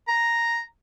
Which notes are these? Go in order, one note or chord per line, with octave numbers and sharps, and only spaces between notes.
A#5